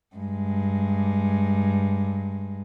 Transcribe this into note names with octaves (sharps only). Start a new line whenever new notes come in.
G2 G#3